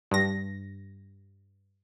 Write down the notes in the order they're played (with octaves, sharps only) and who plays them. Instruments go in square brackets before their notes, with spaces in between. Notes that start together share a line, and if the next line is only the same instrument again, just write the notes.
[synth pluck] G2 A#6